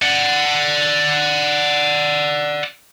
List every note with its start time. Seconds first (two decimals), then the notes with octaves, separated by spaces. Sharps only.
0.02 D5 F#5